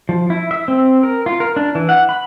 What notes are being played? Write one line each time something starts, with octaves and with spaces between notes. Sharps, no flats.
F3
E4
E5
C4
A#4
F4
A#4
D4
E3
F#5
B5